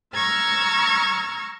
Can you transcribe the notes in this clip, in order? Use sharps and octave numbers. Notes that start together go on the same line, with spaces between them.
A#5 C#6 E6 F6 G#6 A6